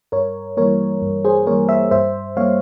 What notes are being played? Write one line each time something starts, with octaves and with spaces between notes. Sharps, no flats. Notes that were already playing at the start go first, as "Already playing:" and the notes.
G2 A#4 C#5
E3 G3 A#3 A#4 C#5
G2
G#4 C5
E3 G3 A#3 A#4 C#5
C5 E5
G2 C5 E5
G3 A#3 C#5 F5